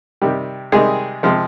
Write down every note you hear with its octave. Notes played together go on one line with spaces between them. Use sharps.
C3 D#3 G3
C3 D#3 G3 G#3 G#4
C3 F3 G#3